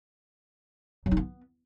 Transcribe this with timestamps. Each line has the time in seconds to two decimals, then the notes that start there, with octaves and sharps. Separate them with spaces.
1.06 F#3
1.11 D#4
1.17 B3